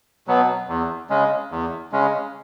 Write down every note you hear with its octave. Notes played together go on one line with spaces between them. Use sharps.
B2 F#3 B3
E2
C#3 G#3 C#4
E2
C#3 G#3 C#4